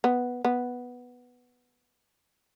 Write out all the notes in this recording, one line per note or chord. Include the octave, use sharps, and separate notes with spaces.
B3
B3